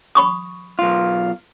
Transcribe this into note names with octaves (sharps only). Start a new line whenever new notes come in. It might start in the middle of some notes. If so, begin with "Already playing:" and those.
B5 C#6 D#6
B1 F4